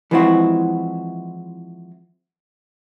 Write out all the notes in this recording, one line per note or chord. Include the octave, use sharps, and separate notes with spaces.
E3 F3 G#3 C4 E4 F#4